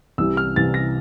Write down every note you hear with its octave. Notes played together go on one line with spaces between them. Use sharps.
C2 C3 E3 G3 E6
F6
C2 C3 E3 G3 A6
A#6